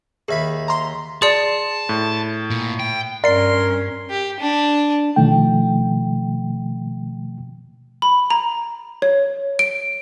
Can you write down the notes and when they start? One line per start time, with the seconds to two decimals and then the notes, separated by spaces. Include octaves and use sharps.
0.28 D#2 G#4 E5 B5
0.68 A#5 C6
1.22 G#4 D5 A5 C6 A6 C#7
1.89 A2
2.50 A#2
2.80 G5
3.24 G2 C#4 A#4 D5 C6 C7
4.10 G4
4.40 D4
5.16 B2 D#3 F3 A3 G5
8.02 B5
8.30 A#5
9.02 C#5
9.59 D7